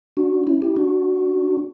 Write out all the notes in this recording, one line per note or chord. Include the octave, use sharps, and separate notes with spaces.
D4 F#4
C#4 E4
E4 G4
D4 F#4